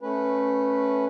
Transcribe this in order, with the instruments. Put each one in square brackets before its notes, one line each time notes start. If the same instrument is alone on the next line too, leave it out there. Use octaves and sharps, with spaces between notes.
[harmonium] A3 C#4 B4